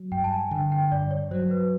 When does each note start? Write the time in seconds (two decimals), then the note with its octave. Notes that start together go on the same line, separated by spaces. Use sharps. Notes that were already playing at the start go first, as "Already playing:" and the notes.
Already playing: F#3
0.12 G2 G5
0.24 A5
0.32 G#5
0.51 D3 G5
0.72 G5
0.92 G2 D5
1.11 C#5
1.31 F#3 C5
1.51 B4